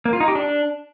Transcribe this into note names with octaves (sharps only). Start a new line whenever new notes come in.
A#3
F4
D#4
G4
D4